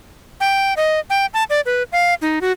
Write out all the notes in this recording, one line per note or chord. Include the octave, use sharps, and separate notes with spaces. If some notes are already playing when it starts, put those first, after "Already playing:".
G5
D#5
G5
A5
D5
B4
F5
D#4
F#4